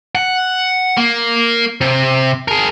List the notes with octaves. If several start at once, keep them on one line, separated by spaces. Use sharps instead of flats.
F#5
A#3
C3
G#4 A#4